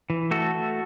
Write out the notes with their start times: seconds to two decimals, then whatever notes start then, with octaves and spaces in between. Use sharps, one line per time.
0.10 E3
0.31 A3 F#4 A4